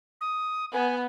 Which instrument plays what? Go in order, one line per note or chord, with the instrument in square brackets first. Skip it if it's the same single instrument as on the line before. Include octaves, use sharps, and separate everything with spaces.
[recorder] D#6
[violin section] B3 [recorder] G#5